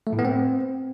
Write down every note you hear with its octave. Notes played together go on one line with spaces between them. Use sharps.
A3
A2
B3
C4